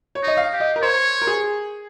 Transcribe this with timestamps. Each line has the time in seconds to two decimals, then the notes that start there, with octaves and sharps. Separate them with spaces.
0.15 C#5
0.23 D#4 D#5
0.37 F5
0.53 G4
0.60 D#5
0.76 A#4
0.82 C5 C#5
1.22 A#4
1.27 G#4